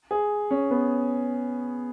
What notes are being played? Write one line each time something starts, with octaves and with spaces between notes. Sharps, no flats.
G#4
C#4
B3